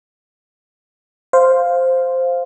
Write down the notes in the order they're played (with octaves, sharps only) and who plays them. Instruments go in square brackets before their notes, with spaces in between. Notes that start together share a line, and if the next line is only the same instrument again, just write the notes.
[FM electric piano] C5 F5